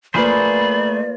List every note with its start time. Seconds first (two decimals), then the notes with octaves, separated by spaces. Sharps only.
0.14 A3 A#3 F4 G#4 B4 C5 D5 B5